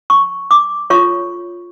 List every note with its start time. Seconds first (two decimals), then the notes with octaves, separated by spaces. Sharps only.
0.10 C#6
0.51 D6
0.90 F4 A4 C#5 C#6